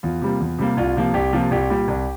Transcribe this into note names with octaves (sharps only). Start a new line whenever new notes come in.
E2 F4
C3 G3 A#3
E2
C3 G3 A#3
C2 F4
C3 F3 A#3
C2 G4
C3 F3 A#3 F4
C2 G4
A#2 G3
C2